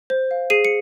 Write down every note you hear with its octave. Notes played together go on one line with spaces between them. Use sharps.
C5
F5
G#4 C7 D#7
C#7